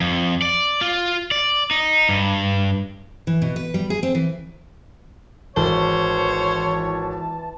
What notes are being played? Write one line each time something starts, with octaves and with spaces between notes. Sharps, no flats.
F2
D5
F4
D5
D#4
G2
E3
B2
B4
G3
G#4
C4
E3
G#1 E3 C5 C#5 A5